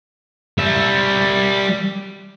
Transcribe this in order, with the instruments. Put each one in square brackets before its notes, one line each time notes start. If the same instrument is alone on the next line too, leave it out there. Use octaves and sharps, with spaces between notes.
[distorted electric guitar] G3 E5